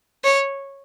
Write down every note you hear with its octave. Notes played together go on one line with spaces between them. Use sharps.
C#5